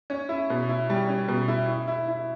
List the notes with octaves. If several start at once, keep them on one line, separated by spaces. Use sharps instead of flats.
C#4
E4
B2
E4
G3
C#4
B2
E4
E4
E4
E4